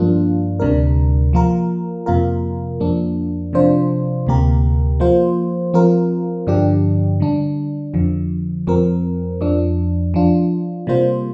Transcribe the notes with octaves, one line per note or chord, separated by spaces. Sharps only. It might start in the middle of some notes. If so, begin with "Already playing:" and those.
Already playing: G2 F3 A#3 D4 F4
D2 C3 G3 D4 A#4
F3 A#3 F4 A#4
F2 C3 A#3 F4 A#4
F2 F3 A#3 D4
C3 F3 D4 F4 C5
D2 C3 A#3 G4 A#4
F3 A#3 F4 C5
F3 C4 F4 A#4
G2 D3 F3 D4 G4
D3 G3 D4
F2 D3 F3
F2 F3 C4 A#4
F2 F3 D4
F3 D4 F4
C3 G3 A#3 F4 C5